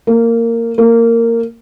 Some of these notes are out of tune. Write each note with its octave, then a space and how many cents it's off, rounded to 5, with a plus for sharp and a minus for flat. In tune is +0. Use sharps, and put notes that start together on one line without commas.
A#3 -15
A#3 -15